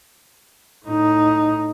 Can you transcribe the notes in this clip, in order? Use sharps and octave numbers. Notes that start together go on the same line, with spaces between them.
A2 D#4